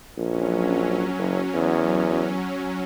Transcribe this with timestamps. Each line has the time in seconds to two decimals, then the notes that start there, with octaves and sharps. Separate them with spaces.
0.18 A#1 F#3 C#4
1.18 F#1
1.54 E2